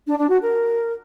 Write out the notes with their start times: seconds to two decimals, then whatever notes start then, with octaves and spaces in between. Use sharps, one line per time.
0.07 D4
0.19 D4
0.30 F#4
0.41 A#4